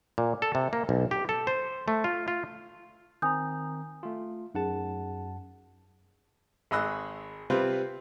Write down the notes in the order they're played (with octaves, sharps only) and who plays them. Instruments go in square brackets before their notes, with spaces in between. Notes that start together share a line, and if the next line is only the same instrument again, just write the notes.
[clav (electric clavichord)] A#2
A4
C3
A#3
B1
G4
A4
C5
A3
F4
F4
[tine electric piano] D#3 C4 A#5 [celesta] G#5 D#6 G6
[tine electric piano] A3 F4
[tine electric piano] F#2 F#5 A5 [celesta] D#4 G#4
[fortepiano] G#1 G#4 D#5 B5 E6 F#6
C3 G3 C4 F4 B4